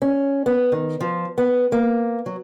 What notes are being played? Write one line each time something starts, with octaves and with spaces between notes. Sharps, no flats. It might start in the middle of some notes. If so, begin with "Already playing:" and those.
C#4
B3
D#3
F3
B3
A#3
F#3